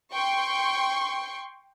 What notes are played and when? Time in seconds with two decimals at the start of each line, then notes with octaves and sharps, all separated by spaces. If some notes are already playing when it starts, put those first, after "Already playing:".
0.11 G5 C6 C#6